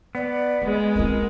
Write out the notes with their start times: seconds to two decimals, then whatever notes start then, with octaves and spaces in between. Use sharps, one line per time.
0.15 B3 D5
0.62 G#3 A#3
0.95 C4 F4 A#4